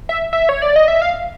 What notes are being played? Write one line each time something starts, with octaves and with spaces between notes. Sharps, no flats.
E5
E5
C#5
D5
D#5
E5
F5